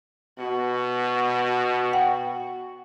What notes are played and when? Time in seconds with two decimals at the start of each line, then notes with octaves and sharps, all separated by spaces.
0.39 B2 F#4
1.93 F#5 G5